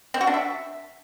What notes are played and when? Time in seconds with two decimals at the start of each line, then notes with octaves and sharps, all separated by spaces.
0.14 C4
0.21 F#4
0.27 D4
0.34 E5